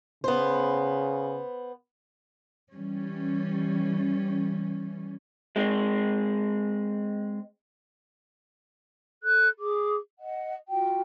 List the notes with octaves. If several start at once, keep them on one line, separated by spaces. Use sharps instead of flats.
C#3 B3 C5
E3 G3 C#4
G#3 C4
A4 F#6
G#4 D6
D#5 F#5
F4 F#4 G5